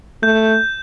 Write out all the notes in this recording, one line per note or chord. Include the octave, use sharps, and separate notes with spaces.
A3 G6